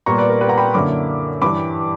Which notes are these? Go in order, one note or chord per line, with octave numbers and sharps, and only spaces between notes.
A#2 G3 B3 A#5 C#6
B4 D5
A#4
G4 B4
F#5 A#5
G5 B5
F#2 D3 A#3 E4 B5 D6
G2 E3 G3 B5 D6